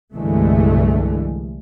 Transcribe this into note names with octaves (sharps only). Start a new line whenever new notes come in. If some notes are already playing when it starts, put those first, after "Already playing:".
C2 G2 D3 E3 G#3 A3